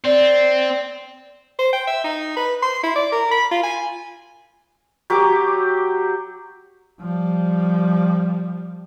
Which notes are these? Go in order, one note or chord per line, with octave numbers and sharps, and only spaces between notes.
C4 D5
C5
G5
E5
D#4
B4
C6
E4
D5
A#4
B5
F4
G#5
F#3 G4 D6
F3 G3